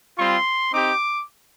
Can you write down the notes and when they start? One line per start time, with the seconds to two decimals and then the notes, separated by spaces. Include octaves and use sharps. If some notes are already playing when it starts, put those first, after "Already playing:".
0.17 G3 C4 F4 C6
0.72 C4 D#4 G4 D6